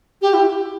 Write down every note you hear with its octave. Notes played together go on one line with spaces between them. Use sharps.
G4
E4